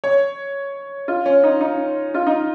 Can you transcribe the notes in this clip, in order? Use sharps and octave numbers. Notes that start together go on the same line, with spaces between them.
C#5
F4
C#4
D#4
D#4
F4
D#4